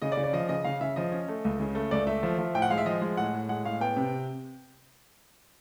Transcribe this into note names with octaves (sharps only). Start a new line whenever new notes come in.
C#3 D#5
D5
C#3
D5
F3 D#5
C#3 D#5
C#3 F5
C#3 E5
F3 D#5
C#4
A3
C#2
C#3
A3
C#2 D5
A3 E5
F3
F3
A2 G5
F#5
G#3 F5
E5
F3 D#5
G#3
A2 F#5
A2
G#3 F#5
A2 F5
B3 G5
C3